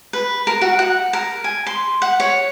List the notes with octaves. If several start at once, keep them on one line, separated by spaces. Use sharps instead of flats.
B4
A#4
F#4
F#5
A#4
G#5
C6
F#5
C#5